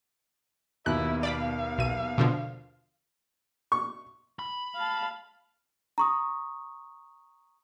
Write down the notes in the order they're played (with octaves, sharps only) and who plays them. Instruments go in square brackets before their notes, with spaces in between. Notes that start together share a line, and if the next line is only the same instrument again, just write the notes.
[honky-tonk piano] D#2 B2 [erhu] E4 [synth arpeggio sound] F#6
[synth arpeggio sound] D5 B5 D6 [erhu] F5
[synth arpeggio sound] B1 D#7
B2 D3 F3
[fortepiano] C#6
[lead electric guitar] B5
[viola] F5 A5
[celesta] A#5 C#6 D#6